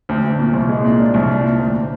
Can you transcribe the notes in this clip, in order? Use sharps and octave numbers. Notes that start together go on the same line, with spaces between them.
D2
D2
A#2
C2
G#3
A#2
D4
C2
D4
A#2
D2